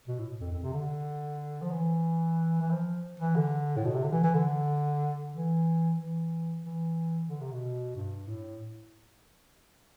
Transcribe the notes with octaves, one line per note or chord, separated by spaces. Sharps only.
B2
A2
F2
F2
C3
D3
F3
E3
E3
F3
E3
D3
A2
B2
C3
D3
E3
E3
D3
E3
E3
E3
D3
C3
B2
G2
A2